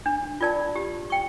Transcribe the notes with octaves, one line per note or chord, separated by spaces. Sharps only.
D4
F4 A#4 D5 A5
G4
G5 C#6